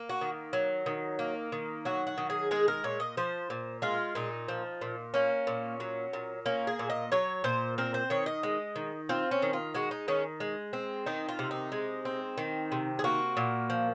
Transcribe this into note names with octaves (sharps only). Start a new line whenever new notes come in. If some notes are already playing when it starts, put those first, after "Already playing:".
Already playing: A#3
F#4
D#3
F#3
D#3
A#3
D#3
F#3 F#4
F#4
D#3
G#4
G#3 G#4
A#4
A#2 C#5
D#5
F3 C5
A#2
G#3 F4
A#2 D#4
F3
A#2
A#3 C#4
A#2
F#3
A#2
A#3 C#4
G#4
A#2
D#5
F#3 C#5
A#2 C5
C4 A#4
C5
D#3 C#5
D#5
G#3
D#3
C4 F4
C#4
D#3
F4
G#3 F#4
D#4
D#3 C#4
G#3
C4
D#3 D#4
F4
C3
D#4
G#3
C4
D#3
C3
G#4
A#3 F#4
A#2
F3